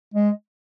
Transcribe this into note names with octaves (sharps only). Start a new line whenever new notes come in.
G#3